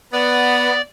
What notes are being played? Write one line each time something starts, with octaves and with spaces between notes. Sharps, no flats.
B3 D5